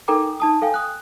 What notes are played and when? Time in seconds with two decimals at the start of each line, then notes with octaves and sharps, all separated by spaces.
0.08 D#4 A4 A#4 G5 A#5 D6
0.40 D#4 A5 D#6
0.62 A4 F5 G5 G#5
0.74 D#6 F#6